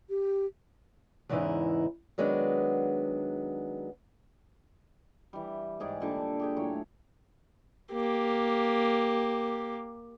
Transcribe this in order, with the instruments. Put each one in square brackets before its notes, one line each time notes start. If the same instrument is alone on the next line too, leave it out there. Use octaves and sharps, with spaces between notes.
[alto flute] G4
[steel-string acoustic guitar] E2 G#2 C#3 E3 D#4 E4
D#3 F#3 G#3 B3 D4
[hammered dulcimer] E3 G3
G#2 G4 G#4 D5
A#2 D3 G3
G4 G#4 G5
A2 F#3 C#5 F5
[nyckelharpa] A#3 G4